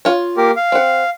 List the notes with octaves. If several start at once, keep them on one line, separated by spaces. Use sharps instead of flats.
F4 C#5
A#3 G4 A#4
F5
C4 F#5